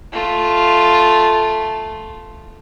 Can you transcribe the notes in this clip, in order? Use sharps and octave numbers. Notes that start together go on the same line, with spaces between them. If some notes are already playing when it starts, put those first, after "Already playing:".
A3 F4